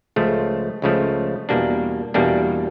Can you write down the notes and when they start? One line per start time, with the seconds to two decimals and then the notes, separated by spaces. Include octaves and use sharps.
0.16 C#2 C#3 F3 A3
0.82 C#2 C#3 F3 A3
1.49 E2 B2 G3 A#3 D4
2.14 E2 B2 G3 A#3 D4